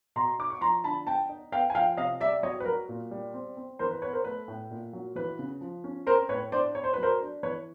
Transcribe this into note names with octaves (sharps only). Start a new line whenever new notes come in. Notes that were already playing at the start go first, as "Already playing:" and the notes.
B2 A#5 C6
D#4 D6
C#6
F3 A#5 C6
D3 A5 B5
B3 G5 A5
D#4
B3 F5 G5
G#5
F3 F5 G5
C3 D#5 F5
G3 D5 E5
F#3 C#5 D#5
B4
F#3 A#4
A#2
G3
C4
C4
E3 A#4 C5
B4
B3 B4 C#5
A#4 C5
A3 B4
A2
A#2
F#3
E3 B4
C#3
F3
C#4
C4 A#4 C5
A2 B4 C#5
D4 C5 D5
D4 C#5
C5
F#3 B4
A#4 C5
D4
E3 B4 C#5